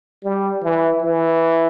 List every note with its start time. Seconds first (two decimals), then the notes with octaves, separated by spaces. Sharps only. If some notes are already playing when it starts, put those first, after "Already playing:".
0.24 G3
0.63 E3
1.02 E3